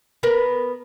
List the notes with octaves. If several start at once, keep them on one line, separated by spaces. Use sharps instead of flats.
B3 A#4 B4